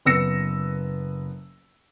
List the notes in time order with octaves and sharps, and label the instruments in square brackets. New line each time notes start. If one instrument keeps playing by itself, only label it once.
[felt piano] F#1 B3 E6 A#6 C#7